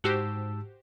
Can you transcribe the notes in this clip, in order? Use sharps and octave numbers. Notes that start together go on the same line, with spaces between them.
G#2 F#4 G4 C5 A5 E6